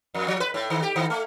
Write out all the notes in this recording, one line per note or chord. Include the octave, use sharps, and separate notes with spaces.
F2
F3
B4
A2
D#3
G4
D#3
A3